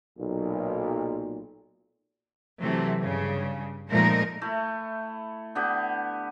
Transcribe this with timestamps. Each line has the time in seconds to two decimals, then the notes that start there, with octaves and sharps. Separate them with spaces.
0.19 B1 A#2
2.62 C3 E3 F#3 A3
3.01 G2 C#3
3.90 A#2 F3 G#3 A3 D#4 A#4
4.42 A3 E4
5.55 D3 B3 G4